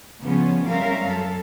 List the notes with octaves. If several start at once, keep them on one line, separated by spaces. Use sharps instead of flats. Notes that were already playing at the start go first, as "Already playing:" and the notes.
C#3 F3 G3 B3 C#4
G3 C4 C#4 A#4 E5 F5
F#2 A4